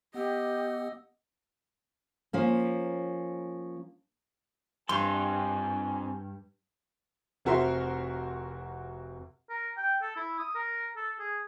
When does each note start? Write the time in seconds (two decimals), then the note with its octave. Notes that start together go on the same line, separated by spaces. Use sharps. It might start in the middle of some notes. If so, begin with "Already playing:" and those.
0.14 B3 G4 D#5 F#5 E6
2.33 F3 A#3 C#4
4.89 G2 C4 A4 G#5 C6
7.45 F1 C4 F#4 A#4 E5 C6
9.50 A#4
9.77 G5
10.02 A4
10.16 E4
10.39 D#6
10.55 A#4
10.96 A4
11.20 G#4